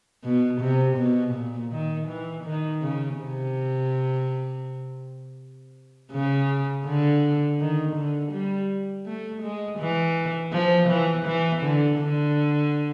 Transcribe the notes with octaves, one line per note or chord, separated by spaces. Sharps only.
B2
C3
B2
A#2
D#3
E3
D#3
C#3
C3
C#3
D3
D#3
D3
G3
A3
G#3
E3
F3
E3
E3
D3
D3